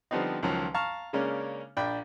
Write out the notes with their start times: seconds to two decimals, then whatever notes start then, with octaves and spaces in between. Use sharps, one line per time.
0.11 D3 F3 G3 B3 C4 D#4
0.43 C#2 D#3 F3 F#3
0.74 F5 A5 A#5 C#6 F6
1.13 C#3 G#3 A#3 C#4 D4
1.77 A#1 D4 G5 B5